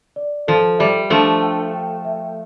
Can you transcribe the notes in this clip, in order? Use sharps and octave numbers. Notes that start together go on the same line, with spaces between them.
D5
F3 A4
G3 E5
F3 A3 D4
G5
G5
E5